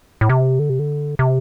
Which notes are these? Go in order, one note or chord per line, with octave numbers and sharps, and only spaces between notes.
A2
C3
D3
C3
D3
C3